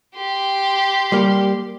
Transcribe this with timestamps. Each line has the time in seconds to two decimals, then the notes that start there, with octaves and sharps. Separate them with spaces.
0.16 G4 C6
1.12 G3 A#3